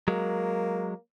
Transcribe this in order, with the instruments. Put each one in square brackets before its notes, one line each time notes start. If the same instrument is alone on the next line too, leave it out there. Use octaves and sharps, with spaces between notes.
[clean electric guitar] F#3 G#3 [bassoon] A#3